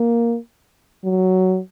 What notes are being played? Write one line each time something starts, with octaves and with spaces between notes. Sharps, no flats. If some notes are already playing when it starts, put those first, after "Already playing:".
Already playing: A#3
F#3